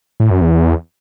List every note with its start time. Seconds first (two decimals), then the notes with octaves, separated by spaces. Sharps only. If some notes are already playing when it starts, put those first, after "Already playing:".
0.20 A2
0.31 F#2
0.41 E2